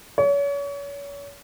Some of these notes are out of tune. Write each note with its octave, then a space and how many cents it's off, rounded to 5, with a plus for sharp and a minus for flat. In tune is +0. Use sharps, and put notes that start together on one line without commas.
C#5 +35